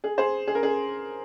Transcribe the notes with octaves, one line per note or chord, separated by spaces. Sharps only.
G#4
G#4 C5
G#4
A#4
G#4